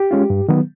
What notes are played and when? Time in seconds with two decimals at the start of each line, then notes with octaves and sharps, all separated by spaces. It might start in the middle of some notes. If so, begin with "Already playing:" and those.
Already playing: G4
0.11 G#3 C#4 F4
0.30 G2
0.49 D#3 F#3 B3